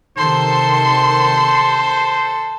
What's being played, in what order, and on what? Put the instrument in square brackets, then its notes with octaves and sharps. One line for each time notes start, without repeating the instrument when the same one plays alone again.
[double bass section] C3 D#3 [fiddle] A4 [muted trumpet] C5 [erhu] C6